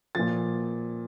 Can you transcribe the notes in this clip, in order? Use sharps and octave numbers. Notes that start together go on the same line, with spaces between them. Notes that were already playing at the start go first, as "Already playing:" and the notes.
A#2 F3 A6